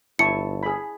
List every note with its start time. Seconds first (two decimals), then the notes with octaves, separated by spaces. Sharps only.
0.19 G1 E4 A5 C#6 C#7
0.63 G#4 B5